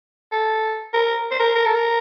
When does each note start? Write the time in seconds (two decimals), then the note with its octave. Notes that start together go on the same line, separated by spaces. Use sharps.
0.32 A4
0.94 A#4
1.31 C5
1.39 A#4
1.55 A#4
1.65 A4
1.75 A#4